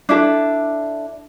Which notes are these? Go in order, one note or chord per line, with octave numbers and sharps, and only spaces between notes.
D4 E4 A4